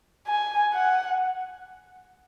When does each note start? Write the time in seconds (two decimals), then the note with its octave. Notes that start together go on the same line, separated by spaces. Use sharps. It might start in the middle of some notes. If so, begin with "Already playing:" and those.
0.28 G#5
0.74 F#5